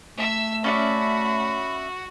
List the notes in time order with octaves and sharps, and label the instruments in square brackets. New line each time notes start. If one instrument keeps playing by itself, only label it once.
[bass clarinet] A3 [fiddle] E5 E6
[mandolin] C#4 D5 E5 [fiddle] F#4 [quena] B5